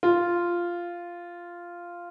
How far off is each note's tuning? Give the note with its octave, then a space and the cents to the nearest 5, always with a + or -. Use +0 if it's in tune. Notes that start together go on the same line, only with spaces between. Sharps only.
F4 -5